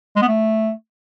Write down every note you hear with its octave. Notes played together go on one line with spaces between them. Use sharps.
G#3
B3
A3